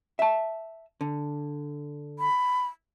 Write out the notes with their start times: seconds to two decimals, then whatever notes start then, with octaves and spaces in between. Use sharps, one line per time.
0.19 E5 A5
1.01 D3
2.19 B5